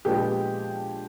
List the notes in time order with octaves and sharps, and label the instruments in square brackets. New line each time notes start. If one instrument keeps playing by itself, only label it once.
[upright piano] A#2 F3 G#3 B3 D4 G4